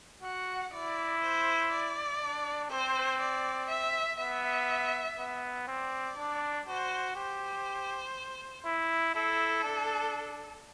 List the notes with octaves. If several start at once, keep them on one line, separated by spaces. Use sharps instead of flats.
F#4 F#5
E4 D5
C5
D5
D4
C4 C5
D5
E5
B3 E5
B3
C4 D5
D4
F#4 C5
G4 C5
E4
E4 A4
D4